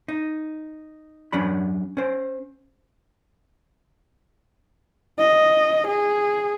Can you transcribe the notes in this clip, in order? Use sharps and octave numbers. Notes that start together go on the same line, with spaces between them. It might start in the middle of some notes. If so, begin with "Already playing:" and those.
D#4
F#3 C#4 D4 B5
C#4 C5
D#5
G#4